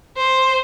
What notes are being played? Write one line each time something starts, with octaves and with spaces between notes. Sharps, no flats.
C5